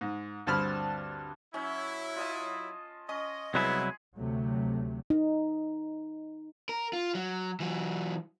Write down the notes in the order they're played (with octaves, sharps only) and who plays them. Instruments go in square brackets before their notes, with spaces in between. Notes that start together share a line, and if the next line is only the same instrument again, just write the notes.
[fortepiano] G#2
D2 G2 C4 A5 B5 F6
[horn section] F#3 E4 [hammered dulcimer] C#4
[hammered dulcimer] F4 D#5 A5
[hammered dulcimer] C#4 [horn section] D#5
[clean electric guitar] C2 F#3 E4 [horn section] G#3 B3 [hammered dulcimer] G#4
[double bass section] D2 C3 F#3 A3
[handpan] D#4
[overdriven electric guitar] A#4
F4
F#3
E3 F#3